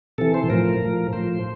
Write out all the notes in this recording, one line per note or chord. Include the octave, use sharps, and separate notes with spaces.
C3 E3 A4
C5
A2 F3 A#4
A2 F3
A2 F3 C5